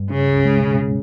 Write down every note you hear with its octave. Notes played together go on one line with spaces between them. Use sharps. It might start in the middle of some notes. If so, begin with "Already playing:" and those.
Already playing: G2
C#3 C#4
C#2
G#3
B2